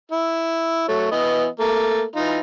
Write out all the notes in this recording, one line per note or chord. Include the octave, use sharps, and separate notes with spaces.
E4
F#3 A3 C#5
E3 B3 D#5
A3 A#3
E3 D#4 F4